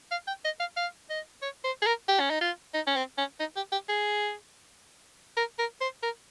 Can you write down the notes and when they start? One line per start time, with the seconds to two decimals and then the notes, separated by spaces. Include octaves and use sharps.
0.11 F5
0.28 G5
0.45 D#5
0.60 F5
0.77 F5
1.10 D#5
1.42 C#5
1.64 C5
1.82 G#4
1.86 A#4
2.09 G4
2.20 C#4
2.30 D#4
2.41 F4
2.74 D#4
2.87 C#4
2.96 C4
3.18 C#4
3.40 D#4
3.56 G4
3.72 G4
3.89 G#4
5.37 A#4
5.59 A#4
5.81 C5
6.03 A#4